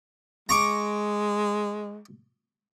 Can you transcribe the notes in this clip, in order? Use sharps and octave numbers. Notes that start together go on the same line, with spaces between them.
G#3 A#5 C#6 D6